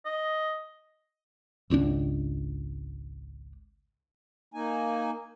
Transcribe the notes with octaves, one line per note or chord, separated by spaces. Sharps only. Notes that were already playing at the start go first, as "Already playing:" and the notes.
D#5
G#1 C#2 C#4 D4
A#3 D#4 G#5